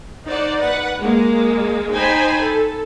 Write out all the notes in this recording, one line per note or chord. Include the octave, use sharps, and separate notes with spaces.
D#4 C5 D5 F#5
B4 F#5
G#3 A#3
D#4 C5 G5 G#5 B5
A4